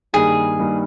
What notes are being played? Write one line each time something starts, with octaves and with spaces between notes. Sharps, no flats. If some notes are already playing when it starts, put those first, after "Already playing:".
G2 D#3 G3 A#3 D#4 G#4
G2 D#3 G3 A#3 D#4